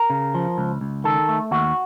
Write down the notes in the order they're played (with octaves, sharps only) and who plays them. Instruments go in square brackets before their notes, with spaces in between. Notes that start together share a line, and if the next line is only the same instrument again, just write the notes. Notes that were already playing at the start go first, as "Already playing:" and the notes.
Already playing: [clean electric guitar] A#4
C#3
F3
C#2
C#2
D#3 A4
A3
D#2 F#4